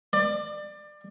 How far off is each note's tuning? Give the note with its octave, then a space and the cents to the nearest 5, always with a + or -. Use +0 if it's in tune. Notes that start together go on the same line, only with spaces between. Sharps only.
D5 +25